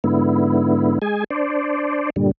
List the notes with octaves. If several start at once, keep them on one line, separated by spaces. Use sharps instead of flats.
G#2 D3 B3 E4
G#3 G#4 G#5
D4 C5 D5
G2 A#2 D3 G3